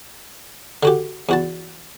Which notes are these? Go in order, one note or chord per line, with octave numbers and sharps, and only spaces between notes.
D3 F#4 G4
E2 F#4 A5